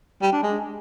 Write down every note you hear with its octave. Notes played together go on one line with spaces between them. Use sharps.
G3
D4
G#3